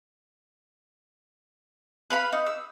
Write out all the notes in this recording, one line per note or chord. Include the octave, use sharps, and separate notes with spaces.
B4 F5 B5
D#4
E6